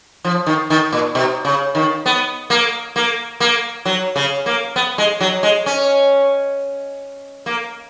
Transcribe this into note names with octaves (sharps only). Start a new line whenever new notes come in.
F3
D#3
D#3
A#2
B2
C#3
D#3
B3
A#3
A#3
A#3
F#3
C#3
A#3
B3
G#3
F#3
G#3
C#4
A#3